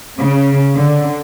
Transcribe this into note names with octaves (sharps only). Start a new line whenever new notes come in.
C#3
D3